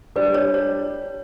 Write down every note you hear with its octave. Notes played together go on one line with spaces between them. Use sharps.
G3 D4 G4 B4 D5
C#5
C#5